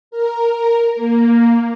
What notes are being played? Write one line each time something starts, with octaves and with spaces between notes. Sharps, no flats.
A#4
A#3